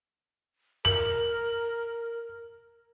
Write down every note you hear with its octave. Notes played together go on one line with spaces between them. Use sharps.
A#4 F#7